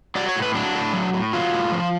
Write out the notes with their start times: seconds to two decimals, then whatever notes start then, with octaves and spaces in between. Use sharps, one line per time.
0.15 F#3 D5
0.29 C#5
0.36 A2
0.42 B4
0.54 F#3 D4
0.74 A2
0.93 F#3
1.13 A2
1.33 F#3 F4
1.53 A2
1.72 F3